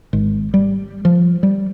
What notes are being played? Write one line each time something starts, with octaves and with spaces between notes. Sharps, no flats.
G#1
G3
F3
G3